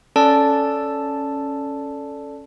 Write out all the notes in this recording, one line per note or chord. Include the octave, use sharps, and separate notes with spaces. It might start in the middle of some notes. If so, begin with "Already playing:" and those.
C#4 A4 D5 A5